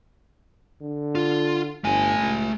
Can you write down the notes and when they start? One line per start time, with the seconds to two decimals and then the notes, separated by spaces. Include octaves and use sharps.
0.81 D3
1.15 F4
1.84 G1 A3 G#5
2.20 C#2